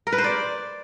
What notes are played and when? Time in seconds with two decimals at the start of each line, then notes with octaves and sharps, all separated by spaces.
0.07 A#4
0.13 B4
0.18 C5
0.24 D5